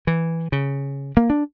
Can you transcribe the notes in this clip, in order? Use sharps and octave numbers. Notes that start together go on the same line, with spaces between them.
E3
C#3
A#3
D4